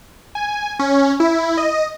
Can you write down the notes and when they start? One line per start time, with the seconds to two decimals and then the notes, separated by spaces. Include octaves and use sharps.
0.35 G#5
0.79 C#4
1.20 E4
1.57 D#5